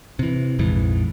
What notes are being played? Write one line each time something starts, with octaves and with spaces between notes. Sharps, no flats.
C3 E3
A#1 F2 G#2 E3